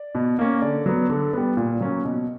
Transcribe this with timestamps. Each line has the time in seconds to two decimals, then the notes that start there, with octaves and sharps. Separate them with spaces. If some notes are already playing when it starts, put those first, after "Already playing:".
Already playing: D5
0.15 B2
0.39 A#3 C#4
0.62 D3 D5
0.86 F#3 B3
1.10 D3
1.33 G3 B3
1.57 A#2
1.81 F#3 A#3 C#4
2.05 B2